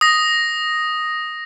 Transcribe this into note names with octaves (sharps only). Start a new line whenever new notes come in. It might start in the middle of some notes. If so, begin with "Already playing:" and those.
D#6 A#6